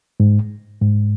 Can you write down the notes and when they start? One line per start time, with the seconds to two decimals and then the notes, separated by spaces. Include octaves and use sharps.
0.20 G#2
0.81 G#2